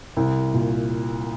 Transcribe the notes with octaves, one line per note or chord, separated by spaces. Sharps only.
C2
A#2